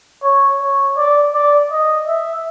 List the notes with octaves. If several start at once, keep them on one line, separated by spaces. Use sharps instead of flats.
C#5
C#5
D5
D5
D#5
E5